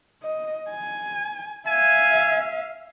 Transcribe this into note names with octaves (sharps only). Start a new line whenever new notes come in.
D#5
G#5
E5 F5 G#5